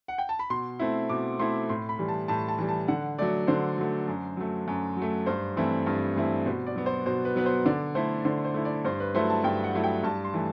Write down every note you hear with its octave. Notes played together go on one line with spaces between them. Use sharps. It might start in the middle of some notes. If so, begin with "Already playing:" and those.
F#5
G5
A5
B5
B2 C6
A3 C4 E4
B2 D6
A3 C4 E4 C6
A2 C6
B5
E3 G3
A5
A2 A5
A5
E3 G3
A5
D3 F#5
F#3 A3 D5
D3 C5
F#3 A3
F#2
F#3 A3
F#2
F#3 A3
G2 C5
E3 A3 C4 E4
G2
E3 A3 C4 E4
B2 C5
D5
F#3 B3
C5
B2 C5
B4
F#3 B3 B4
C5
D3 D5
A3 E4 C5
D3 C5
C5
A3 E4
D5
G2 C5
B4
F#3 A3 E4 C5
A5
G2 G5
F#5
F#3 A3 E4
G5
G2 A5
C6
E3 A3